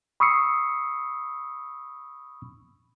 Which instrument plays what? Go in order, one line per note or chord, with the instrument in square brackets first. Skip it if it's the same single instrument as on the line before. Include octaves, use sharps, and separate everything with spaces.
[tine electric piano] B5 C#6 D#6 E6 C7 C#7